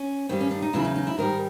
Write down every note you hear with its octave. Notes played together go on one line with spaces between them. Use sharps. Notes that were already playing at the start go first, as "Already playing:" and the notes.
Already playing: C#4
G2 D#3 G3 C4
C#4
D4
D#4
E2 C#3 F#3 E4
D#4
D#4
E4
G#2 D#3 G3 A#4